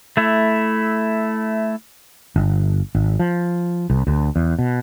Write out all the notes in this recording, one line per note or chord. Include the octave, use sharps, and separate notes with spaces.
A3 E4
G1
G#1
F3
C2
D2
E2
B2